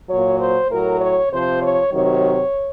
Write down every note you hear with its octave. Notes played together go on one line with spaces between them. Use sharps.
A#2 F#3 C#5
C5
A2 F#3 A#4
C#5
C3 F3 C5
C#5
C3 D#3 F#3 C#5